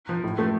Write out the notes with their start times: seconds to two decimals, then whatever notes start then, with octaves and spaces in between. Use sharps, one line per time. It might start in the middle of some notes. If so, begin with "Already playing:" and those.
0.09 F3
0.24 A2
0.38 F3 A3